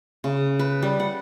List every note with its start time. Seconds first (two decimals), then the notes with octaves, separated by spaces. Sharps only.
0.24 C#3
0.59 B4
0.82 G3
1.00 F#5